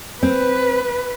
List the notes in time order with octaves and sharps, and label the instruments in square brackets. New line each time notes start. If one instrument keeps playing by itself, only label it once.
[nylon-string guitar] C4 [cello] B4